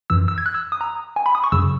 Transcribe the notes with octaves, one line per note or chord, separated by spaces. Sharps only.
F#2 E3 E6
E6
G#6
F#6
E6
D#6
A#5
G#5
B5
D#6
C#6
F#2 C#3 F#3 E6